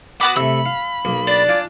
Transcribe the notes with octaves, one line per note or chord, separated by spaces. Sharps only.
B3 F#4 B5 D6
C3 A3 E6
F5
B1 A#3
D4 D5
F4 G#5 D6